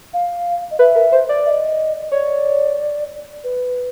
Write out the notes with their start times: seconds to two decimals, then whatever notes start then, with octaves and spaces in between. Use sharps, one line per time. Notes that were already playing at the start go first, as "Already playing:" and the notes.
0.13 F5
0.71 D#5
0.79 B4 E5
0.95 A#4
1.12 C5
1.29 D5
1.45 E5
1.50 D#5
2.02 D#5
2.12 C#5 D5
3.44 B4